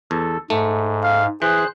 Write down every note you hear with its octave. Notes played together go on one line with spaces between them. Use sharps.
E2 A4
G#2 A3
F5
E3 G#4 C5 F#6